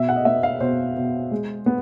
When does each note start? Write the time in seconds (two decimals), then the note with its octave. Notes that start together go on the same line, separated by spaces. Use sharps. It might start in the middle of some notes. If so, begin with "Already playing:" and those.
Already playing: B2 E5
0.09 F#5
0.16 D#5
0.25 B3 E5
0.43 F5
0.60 B2 C5
0.96 B2
1.31 G#3
1.66 B3